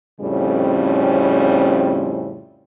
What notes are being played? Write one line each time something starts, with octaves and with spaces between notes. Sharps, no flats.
F2 A2 C#3 G3 C4 C#4